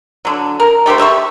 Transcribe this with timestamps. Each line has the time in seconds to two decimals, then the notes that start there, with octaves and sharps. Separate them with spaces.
0.25 D3 F#3
0.60 A#4
0.86 A3 G4 A4 C5
0.98 G4 E5 A#5 C#6